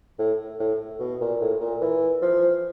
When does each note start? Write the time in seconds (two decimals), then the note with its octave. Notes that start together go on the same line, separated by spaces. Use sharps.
0.19 A2
0.59 A2
0.99 B2
1.21 A#2
1.41 A2
1.61 A#2
1.81 E3
2.22 F3